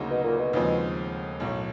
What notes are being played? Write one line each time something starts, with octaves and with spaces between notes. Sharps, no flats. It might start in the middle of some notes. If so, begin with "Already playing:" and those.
Already playing: D2 C#3 F#3 A#3 D#4
B2
A#2
B2
D#2 C#3 F3 G#3 C4
B1 A2 F#3